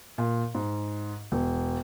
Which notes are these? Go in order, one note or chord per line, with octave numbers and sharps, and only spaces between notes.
A#2
G#2
E1